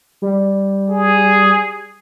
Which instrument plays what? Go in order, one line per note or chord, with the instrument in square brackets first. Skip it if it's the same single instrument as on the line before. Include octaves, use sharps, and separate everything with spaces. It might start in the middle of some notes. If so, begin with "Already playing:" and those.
[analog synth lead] G3
[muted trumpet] G#4